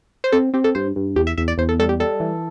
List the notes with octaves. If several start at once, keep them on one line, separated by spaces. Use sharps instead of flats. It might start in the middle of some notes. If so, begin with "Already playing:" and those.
C5
C4 A4
C4 G4
A4
G2 C5
G2
E2 G4
E5
E2 E5
D5
E2 C5
A4
G3 A4
G4
G3 A4
E3